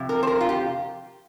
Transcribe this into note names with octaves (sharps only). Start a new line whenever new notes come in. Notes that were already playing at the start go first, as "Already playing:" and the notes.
Already playing: F2 C3
A#4
C5
A#4
F4
G4